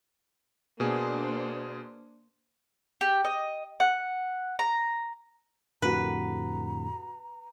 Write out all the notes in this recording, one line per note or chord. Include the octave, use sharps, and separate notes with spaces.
B2 A#3 D4 G#4 C5
G4
D#5
F#5
A#5
F2 A2 D3 F#4 G4 B4 A#5